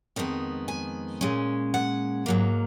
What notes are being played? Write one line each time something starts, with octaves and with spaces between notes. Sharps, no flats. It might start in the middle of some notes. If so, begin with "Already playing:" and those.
F2 D#3 G#3 B3
G#5
A#2 G#3 C#4
F#5
G#2 F#3 A#3